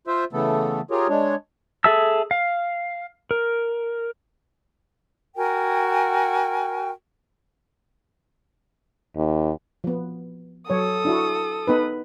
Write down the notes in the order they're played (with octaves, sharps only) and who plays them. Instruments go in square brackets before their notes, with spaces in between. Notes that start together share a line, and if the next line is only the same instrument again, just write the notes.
[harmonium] F4 C5 E5
C#3 E3 A3 B3 A4
F4 G4 G#4 A#4 C#5
G#3 D4 C#5
[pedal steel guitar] G#4 A4 E5 A5 E6
F5
A#4
[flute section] F#4 A#4 G5 G#5
[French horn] D#2
[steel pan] F3 B3
[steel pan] F#3 C#5 [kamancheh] A4 D#6
[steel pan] D4 E4 F#4
B3 D#4 B4